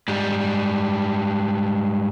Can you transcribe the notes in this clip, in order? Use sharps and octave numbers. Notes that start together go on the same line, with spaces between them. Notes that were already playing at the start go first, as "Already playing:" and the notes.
G#2 G3